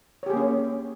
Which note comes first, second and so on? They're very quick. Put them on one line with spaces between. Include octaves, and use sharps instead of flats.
C#5 G4 G#4 A#3 C#4